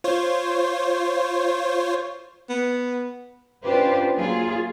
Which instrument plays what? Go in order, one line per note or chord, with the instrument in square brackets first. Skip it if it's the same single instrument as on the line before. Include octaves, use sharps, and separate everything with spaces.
[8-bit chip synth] F4 C5 C#5
[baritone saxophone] B3
[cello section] C#4 D4 F4 G4 B4 C5
F#3 A#3 F4 G#4